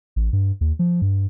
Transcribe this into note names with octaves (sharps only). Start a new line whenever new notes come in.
A1
G2
D#2
F3
G2